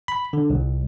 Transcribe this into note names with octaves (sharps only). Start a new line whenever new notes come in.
B5
D3
C2